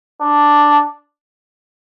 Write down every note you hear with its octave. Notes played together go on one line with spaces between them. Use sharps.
D4